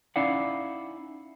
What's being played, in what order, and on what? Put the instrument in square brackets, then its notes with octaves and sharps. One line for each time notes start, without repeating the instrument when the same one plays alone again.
[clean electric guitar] C#4 D#4 E4 D5 F5 F#5